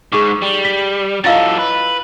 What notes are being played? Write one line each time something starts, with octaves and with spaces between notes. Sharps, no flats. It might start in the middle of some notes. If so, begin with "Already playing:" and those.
G#2 G#4 C#6 D6
G3
B6
F#3 E4 F4 A4 D#5 F5 A6
B4